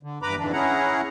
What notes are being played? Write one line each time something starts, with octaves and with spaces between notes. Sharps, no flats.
D3
E2 G2 B4 A#5 B5 D6
F2 G#2 D3 E3 D4
C#4 E4 G#4 F#5 A#5